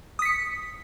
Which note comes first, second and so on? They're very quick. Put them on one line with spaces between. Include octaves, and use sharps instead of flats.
D#6 B6 C#7